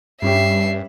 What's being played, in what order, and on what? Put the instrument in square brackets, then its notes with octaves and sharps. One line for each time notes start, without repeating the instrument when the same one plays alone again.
[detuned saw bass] G2 [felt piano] G3 C#4 G4 [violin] E5 C7